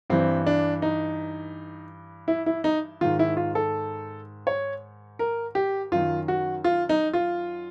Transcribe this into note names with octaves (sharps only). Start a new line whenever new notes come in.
G2 E3 C4
D4
D#4
E4
E4
D#4
G#2 D#3 F4
E4
F4
A4
C#5
A#4
G4
F#2 D#3 F4
F#4
F4
D#4
F4